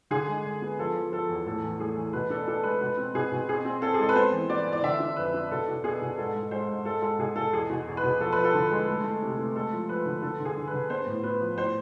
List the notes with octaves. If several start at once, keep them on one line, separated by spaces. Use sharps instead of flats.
D3 G#4
G#3
D3
B3
F3 A4
F3
F3 A4
E2
A2 A4
E3
A3 G#4
E3
B2 B4
D4 A4
D4 A4
G#3 B4
B2 B4
C4
B2 G#4
B2
C4 G#4
C4
C4 A4
G#4
G#3 A4
B4
B3 C5
E3
B3 D5
E3
D5
D3 E5
D4
F2 B4
D4
B2 A4
B2
B3 G#4
B2
G#2 A4
G#3
G#3 C5
G#2
G#3 A4
G#3 A4
B2 G#4
B2 A4
E2 G#4
B2
E2
B4
B2
F3 A4
F3 B4
A4
D3
G#3
A3
A3
C3
A3
G#3 A4
F3
F3 B4
D3
D3 A4
D3
G#4
D3
B4
D3
B3 C5
A2
B3 B4
F3
A2 C5